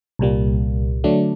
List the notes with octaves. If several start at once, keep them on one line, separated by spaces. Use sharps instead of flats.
C2 A#2 G3 A#3
D3 F#3 A3 D4